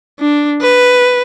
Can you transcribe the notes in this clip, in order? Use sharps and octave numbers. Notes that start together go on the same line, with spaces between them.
D4
B4